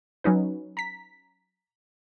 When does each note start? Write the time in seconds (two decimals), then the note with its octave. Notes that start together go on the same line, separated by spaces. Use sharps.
0.24 F#3 C#4 D#4 B4
0.77 A#5 B6